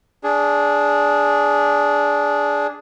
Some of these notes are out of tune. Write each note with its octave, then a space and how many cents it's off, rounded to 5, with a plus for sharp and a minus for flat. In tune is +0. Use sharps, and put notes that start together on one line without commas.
D4 -15 G#4 +0